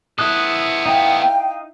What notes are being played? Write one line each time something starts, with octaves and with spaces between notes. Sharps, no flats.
B3 E4 A4 D#6 F#6
D#4 F5 G5